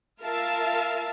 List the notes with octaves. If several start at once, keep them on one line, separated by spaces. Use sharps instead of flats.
F4 A#4 E5 F5 A5